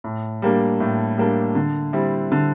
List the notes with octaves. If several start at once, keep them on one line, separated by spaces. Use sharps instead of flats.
A2
G3 A#3 D4
A2
G3 A#3 D4
D3
G3 C4 E4
D3